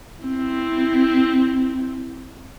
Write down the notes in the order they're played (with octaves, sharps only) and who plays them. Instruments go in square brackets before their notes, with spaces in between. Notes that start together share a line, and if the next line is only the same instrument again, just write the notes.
[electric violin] C4 E4